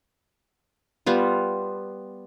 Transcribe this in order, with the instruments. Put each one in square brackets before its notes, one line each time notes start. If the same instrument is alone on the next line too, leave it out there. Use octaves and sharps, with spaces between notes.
[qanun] G3 B3 F4